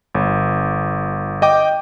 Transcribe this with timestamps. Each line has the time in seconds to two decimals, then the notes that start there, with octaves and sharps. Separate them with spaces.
0.15 G1
1.42 D#5 G5 D6